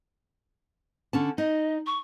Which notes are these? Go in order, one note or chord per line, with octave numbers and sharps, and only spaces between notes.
D3 C#4 A5
D#4 D#5
C#6